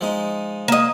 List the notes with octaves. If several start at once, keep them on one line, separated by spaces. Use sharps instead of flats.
F3 G#3 D#4
A#3 D#5